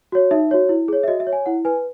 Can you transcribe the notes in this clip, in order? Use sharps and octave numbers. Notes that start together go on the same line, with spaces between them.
F#4 C#5
D#4 E5
F#4 C#5
E4
G#4 C#5
E5
F#4 D#5
E5
C#5
G#5
E4 F#5
B4 G#5